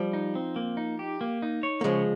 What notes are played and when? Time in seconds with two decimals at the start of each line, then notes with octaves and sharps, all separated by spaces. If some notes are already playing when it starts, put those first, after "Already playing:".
Already playing: F3 G3
0.13 D#4
0.35 C4
0.56 A#3
0.77 D#4
0.99 G4
1.21 A#3
1.42 D#4
1.63 C#5
1.81 A#3
1.84 C#3 F3 G#3